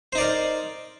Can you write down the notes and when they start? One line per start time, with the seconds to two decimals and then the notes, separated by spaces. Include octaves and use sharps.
0.13 C5
0.15 D#4
0.18 D5
0.21 A#4